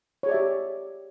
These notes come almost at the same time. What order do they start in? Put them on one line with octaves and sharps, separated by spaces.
C#5 G#4 D5 E5 G4